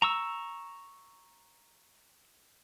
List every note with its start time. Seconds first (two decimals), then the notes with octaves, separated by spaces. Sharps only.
0.02 A#5 C#6 E6